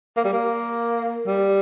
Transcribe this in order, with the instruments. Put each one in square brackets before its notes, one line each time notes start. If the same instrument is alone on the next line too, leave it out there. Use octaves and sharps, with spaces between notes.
[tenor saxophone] A#3
G3
A#3
G3